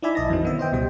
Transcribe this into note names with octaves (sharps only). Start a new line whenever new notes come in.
D#4 E4 D5 E5 G#5 B5
B1 D#5 A5 A#6
F#2 D#3 E3 F#3 C4
D#3 B3 E5
C5 D#5 G5
C#2 B2 G3 G5